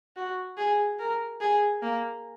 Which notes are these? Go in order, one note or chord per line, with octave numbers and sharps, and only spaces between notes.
F#4
G#4
A#4
G#4
A#3